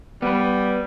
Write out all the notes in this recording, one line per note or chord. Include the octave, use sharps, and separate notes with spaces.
G3 B3 B4